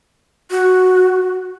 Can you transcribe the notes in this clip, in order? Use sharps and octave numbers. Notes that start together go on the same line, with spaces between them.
F#4